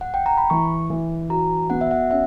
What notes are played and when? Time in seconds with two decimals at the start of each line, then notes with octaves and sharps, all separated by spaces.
0.01 F#5
0.14 G5
0.26 A#5
0.37 B5
0.50 E3 C#6
0.90 E3
1.30 F#4 A#5
1.70 B3 F#5
1.81 E5
1.91 F#5
2.11 C#4 E5